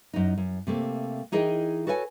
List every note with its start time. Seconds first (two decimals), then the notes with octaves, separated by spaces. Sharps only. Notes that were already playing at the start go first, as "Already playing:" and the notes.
0.14 F#2 D#4
0.37 F#2
0.67 C3 A3 A#3
1.32 E3 D#4 G#4 A#4 D#5 G5
1.87 F#4 A4 B4 C#5 F#5 G#5